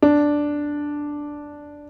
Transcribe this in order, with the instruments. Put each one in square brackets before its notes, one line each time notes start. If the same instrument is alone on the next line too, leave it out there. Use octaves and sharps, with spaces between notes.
[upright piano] D4